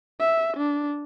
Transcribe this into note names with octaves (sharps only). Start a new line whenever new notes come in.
E5
D4